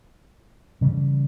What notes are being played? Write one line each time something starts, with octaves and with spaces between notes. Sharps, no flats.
C#3 E3 G3